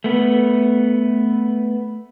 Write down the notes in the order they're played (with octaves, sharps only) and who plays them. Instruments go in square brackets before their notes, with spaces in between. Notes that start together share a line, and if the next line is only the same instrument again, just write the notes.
[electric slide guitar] A3 B3